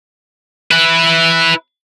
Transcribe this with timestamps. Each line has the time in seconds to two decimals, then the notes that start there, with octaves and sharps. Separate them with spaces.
0.71 E4 B4